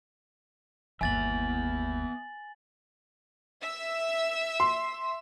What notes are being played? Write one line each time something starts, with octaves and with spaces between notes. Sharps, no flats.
G1 D#2 B3 E5 G#5 A6 F#7
E5 E6
C6